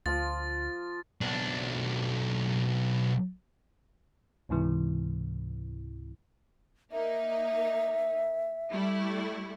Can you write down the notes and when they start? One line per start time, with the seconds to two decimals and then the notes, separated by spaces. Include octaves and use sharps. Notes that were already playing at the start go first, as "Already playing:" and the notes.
0.06 D2 F3 F4 A6
1.21 B1 D4
4.49 C#2 G#2 C3 E3
6.92 A#3 D#4 E5
8.70 G3 A3 E4